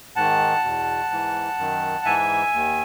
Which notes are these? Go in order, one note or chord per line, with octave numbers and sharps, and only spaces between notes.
G#2 D#3 F#5 A5
E2 B2
G#2 E3
F#2 D#3
G#2 E3 E5 G#5
D#2 D#3